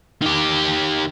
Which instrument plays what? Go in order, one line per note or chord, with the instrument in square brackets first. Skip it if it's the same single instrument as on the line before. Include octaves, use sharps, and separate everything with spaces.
[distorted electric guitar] D#3 G4